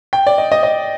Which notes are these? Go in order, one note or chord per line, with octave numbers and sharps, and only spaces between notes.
G5
D5
D#5
D#5
D#5